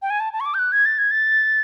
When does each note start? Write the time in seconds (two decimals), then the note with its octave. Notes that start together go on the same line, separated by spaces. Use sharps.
0.02 G5
0.10 G#5
0.20 A5
0.33 A5
0.40 C#6
0.46 D6
0.54 G6
0.59 F#6
0.72 G#6
0.85 A6
0.99 G#6
1.11 A6